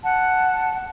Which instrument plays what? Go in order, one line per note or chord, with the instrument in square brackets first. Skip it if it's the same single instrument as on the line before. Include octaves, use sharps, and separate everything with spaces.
[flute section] F#5 A5